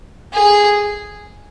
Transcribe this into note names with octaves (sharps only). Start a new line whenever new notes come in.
G#4